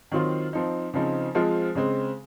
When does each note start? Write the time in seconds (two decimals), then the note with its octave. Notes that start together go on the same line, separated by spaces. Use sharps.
0.12 D#3 F#3 C4 F4
0.53 F3 C4 D#4
0.94 C#3 F3 C4 D#4
1.35 F3 G#3 C4 F4
1.75 C#3 G#3 C4